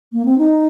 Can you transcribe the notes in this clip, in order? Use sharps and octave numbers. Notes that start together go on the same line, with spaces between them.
A#3
C4
D#4